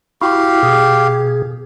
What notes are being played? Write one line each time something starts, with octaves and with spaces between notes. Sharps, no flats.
E4 F#4 G4 F5
B2 G#4